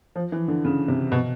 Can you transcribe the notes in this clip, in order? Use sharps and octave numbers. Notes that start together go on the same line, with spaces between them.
F3
E3
D3
C#3
C3
B2